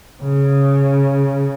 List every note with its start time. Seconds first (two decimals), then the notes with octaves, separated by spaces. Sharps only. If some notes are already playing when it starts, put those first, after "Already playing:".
0.22 C#3